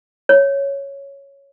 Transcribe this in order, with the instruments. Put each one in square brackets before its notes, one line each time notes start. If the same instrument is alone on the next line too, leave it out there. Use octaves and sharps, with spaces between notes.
[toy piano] C#5